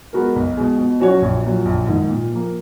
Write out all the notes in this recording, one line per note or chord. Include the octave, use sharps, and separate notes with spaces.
G#3 B3 F#4 A#4
B1
B2 G#3
B2
F#3 C#4 F#4 C#5
A#1
A#2 F#3
A#1
G#2 D#3
A#2
F3 A#3